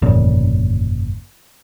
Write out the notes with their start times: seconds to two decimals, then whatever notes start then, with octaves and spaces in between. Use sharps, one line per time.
0.02 G1 F2 A#2 C#3